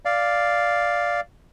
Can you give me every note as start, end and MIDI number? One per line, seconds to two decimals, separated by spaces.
0.05 1.21 74
0.05 1.21 77